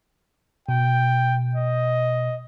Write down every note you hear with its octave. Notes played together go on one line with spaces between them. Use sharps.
B2 G5
D#5